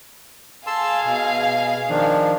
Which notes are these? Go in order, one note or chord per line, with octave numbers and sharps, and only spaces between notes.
G#4 F5 A5 C6 E6
B2
D#3 F3 D4